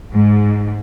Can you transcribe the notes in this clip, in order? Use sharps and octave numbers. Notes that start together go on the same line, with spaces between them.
G#2